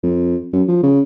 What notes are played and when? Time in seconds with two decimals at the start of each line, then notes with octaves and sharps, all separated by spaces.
0.03 F2
0.53 F#2
0.68 F3
0.83 C#3